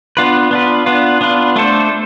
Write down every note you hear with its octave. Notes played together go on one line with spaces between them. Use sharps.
B3 D4 F4 B4
B3 D4 F4 B4
B3 D4 F4 B4
B3 D4 F4 B4
A3 D4 A4 C5